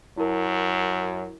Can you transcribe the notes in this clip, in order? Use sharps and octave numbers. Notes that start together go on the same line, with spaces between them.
F#2 E4 A#4